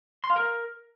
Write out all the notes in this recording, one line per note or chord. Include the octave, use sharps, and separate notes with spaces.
C6
F5
A#4